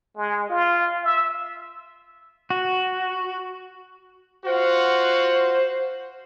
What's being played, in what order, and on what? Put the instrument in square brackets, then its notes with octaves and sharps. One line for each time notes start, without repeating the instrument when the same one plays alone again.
[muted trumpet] G#3
F4
E5
[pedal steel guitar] F#4
[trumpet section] F4 F#4 F#5 [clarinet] C5